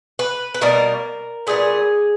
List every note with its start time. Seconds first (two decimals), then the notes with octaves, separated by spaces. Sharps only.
0.19 B4
0.54 B4
0.61 B2 G3 A#3 A#4
1.47 A#2 G3 B3 G#4